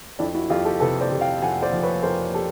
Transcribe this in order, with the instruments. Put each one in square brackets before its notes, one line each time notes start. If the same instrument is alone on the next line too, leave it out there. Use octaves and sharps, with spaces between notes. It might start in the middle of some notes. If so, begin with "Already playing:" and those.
[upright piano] F2 D4 E4
E4 F#4
F2 F4 G4
G4 A4
C3 A4 B4
C5 D5
C3
F5 G5
F2 F#5 G#5
C5 D5
F3
B4 C#5
F2 A#4 C5
G4 A4